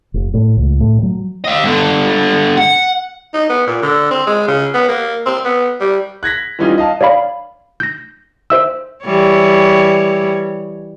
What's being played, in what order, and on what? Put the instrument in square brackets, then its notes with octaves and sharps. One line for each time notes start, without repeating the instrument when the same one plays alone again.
[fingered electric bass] F1
A2
C#2
A2
F#3
[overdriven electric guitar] D#5 F5
G2 D3
F#5
[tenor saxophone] D#4
B3
A#2
D3
C4
G#3
C#3
B3
A#3
C4
B3
G3
[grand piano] F#6 G#6 A#6 B6
E3 G3 C#4 D#4 F4
D#5 F5 A5
[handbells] C#5 D5 F5 B5
G6 A#6
C5 E5 E6
[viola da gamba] E3 G3 C#5